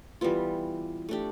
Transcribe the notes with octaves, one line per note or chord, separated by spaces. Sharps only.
E3 G3 B3 F4
A3 D4 G4